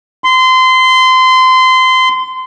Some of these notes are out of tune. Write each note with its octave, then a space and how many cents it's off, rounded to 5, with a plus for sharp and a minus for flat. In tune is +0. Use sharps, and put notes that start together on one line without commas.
C6 -25